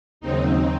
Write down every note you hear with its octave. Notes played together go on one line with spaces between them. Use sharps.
D#2 C#3 F#3 C4 D#4